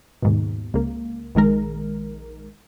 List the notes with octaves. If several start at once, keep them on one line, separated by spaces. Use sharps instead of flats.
D#2 G#2 B2
C#2 A#3
A#1 D#3 G#3 A#4